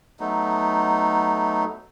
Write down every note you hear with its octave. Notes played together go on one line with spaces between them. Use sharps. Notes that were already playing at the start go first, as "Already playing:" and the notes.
F#3 A3 B3 D#4